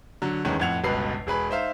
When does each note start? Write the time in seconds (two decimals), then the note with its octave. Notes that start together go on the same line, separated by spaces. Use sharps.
0.22 D3 F#3
0.45 E2 G2 D#3 G#3 C#4
0.60 F2 A2 F#5 G#6 F7
0.84 G1 C#2 B2 B4 C7
1.27 E1 G#4 B4 B5
1.50 D#4 C5 E5 F5